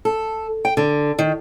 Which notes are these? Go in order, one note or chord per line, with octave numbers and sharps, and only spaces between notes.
A4
G5
D3
D#3